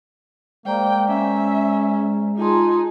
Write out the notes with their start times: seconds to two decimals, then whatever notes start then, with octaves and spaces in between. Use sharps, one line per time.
0.66 G#3 A#3 C5 D5 G5 A#5
1.09 C#4 E5
2.38 D#4 F4 G#4 A5 C6